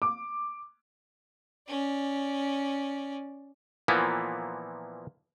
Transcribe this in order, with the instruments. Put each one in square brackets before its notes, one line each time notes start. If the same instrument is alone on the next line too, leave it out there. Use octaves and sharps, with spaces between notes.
[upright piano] D6
[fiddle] C#4 D5
[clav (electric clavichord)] A#2 E3 F3 A#3 B3 E4